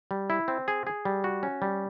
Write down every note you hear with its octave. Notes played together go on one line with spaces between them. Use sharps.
G3
E4
C4
G#4
G#4
G3
F#4
C#4
G3